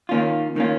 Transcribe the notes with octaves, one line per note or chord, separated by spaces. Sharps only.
D#3 A#3 C#4 F4
D#3 A#3 C#4 F4